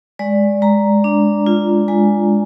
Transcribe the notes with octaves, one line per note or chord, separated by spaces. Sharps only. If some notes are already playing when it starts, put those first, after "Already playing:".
G#3 D5
G#3 A#5
D4
F4
G#3 G#5